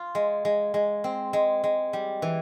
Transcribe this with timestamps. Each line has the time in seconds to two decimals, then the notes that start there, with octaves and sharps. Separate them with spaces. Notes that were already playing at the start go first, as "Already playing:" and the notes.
Already playing: F4
0.15 G#3
0.45 G#3
0.74 G#3
1.04 C4
1.33 G#3
1.64 G#3
1.93 G3
2.22 E3